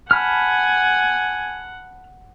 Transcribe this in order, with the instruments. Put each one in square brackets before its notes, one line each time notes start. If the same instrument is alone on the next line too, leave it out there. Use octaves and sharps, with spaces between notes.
[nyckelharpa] F#5 [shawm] G#5 [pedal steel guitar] A5 B5 F6